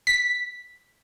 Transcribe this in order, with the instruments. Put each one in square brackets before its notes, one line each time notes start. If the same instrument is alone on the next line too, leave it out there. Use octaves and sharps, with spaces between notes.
[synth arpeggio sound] B6